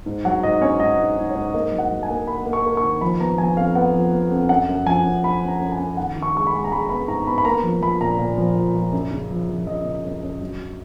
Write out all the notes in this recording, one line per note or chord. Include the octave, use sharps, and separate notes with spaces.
G#2
F#3 F#5
G#2 D#5
C#4 C#5
G#2 D#5
G#2
G#2
C#5
G#2
A#3 D#5
F#3
F#5
F#3
G#5
A#3
A#3 B5
A#3
C#6
A#3
C#6
D#3
F3 B5
B3 A#5
F3 G#5
F2 F5
B3 F#5
F3
B3
F2
F#2 F#5
F#2
F3 G#5
F#2
F#2 B5
F#2
A#5
F#2
G#5
F#2
D#3 F#5
D#3
C#6
G#3 C#6
B5
G#3
A#5
G#3 B5
B3 B5
G#2 A#5
B3 B5
B5
A#3 A#5
F3
F3 B5
A#2 A#5
A#2
F3
A#2
F3
F#2
C#3
F3
F3
F3 D#5
C#3
F#2
F#2
F#3